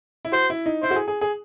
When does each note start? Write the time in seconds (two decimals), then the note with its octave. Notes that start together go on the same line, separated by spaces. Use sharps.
0.25 E4
0.32 F#4 C5
0.50 E4
0.66 D#4
0.83 E4 C5
0.91 F#4
0.96 G#4
1.08 G#4
1.21 G#4